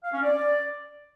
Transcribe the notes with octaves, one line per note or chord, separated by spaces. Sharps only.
F5
C#4
D5